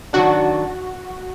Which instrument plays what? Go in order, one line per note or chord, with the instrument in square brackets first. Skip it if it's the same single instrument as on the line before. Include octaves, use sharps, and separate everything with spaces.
[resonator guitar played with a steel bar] D#3 F#3 D4 [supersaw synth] F#4